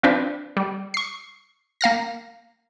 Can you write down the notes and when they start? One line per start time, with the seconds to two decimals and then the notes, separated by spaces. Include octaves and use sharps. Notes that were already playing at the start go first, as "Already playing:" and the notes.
0.03 F3 C4 D4 B4 C5
0.57 G3
0.94 C#6 C7
1.81 A#3 F5 F6 A#6